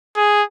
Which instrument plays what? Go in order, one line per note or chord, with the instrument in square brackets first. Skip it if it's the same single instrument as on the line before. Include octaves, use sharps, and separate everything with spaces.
[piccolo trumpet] G#4